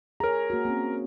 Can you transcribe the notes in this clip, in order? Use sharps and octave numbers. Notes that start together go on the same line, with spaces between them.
G#4 A#4 C#5 A#5
A#3 F#4
A#3 C4 C#4